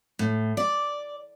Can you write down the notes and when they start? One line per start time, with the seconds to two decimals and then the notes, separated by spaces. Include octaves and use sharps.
0.19 A2
0.57 D5